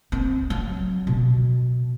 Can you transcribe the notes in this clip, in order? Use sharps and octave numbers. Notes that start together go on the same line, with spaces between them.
C4
F#3
B2